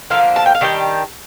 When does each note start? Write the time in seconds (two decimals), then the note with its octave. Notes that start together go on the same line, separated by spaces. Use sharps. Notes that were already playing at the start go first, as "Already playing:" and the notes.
0.10 D3 F3 A#3 F5
0.36 A5
0.46 G5
0.55 F5
0.61 D#3 G3 D4 G5